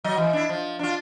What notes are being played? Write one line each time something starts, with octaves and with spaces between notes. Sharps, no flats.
F#3 D#5
E3
D4 E4
F3
D4 F4